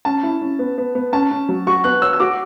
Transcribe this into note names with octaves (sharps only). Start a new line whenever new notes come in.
C#4 A5
E4
C#4
B3
B3
B3
C#4 A5
C#4
F#3
F#4 C#6
B3 F#6
C#5 E6
E6
F#4 D6